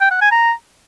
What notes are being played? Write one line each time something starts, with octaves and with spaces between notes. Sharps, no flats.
G5
F#5
G#5
A#5